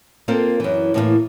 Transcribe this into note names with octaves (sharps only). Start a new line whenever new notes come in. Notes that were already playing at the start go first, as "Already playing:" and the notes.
A#3 C4 F4 A4 A#4
F#2 E3
A2 E3 G3 A#3